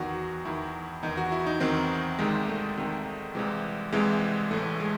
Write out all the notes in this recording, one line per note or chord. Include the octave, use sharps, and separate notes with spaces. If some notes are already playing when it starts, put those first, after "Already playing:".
Already playing: E2 D#3 F#4
E2 D#3 E4
E2 D#3 D#4
F#4
E4
D#4
E2 D#3 C4
C2 C3 D#3 G#3
A3
C2 C3 D#3
C2 C3 E3 G#3
C2 C3 E3 G#3
A1 A2 E3 A3
G#3